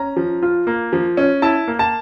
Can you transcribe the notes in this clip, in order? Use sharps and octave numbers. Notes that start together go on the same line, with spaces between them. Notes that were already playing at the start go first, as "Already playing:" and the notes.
Already playing: C#4 A#5
F3
F4
A#3
F3
C#4
E4 A5
A#3
A5